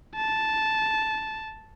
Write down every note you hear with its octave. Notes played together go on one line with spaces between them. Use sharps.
A5